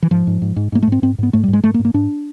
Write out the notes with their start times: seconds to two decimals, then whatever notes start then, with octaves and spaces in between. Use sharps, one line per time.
0.03 E3
0.11 G#2 F3
0.27 G#2
0.42 G#2
0.56 G#2
0.72 G#2 A#3
0.83 A3
0.87 G#2 C4
1.02 G#2 C4
1.18 G#2 B3
1.33 G#2 A3
1.44 G3
1.48 G#2
1.53 G#3
1.64 G#2 A3
1.74 A#3
1.79 G#2
1.85 A#3
1.94 G#2 D4